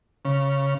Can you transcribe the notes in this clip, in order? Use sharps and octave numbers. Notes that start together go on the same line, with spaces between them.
C#3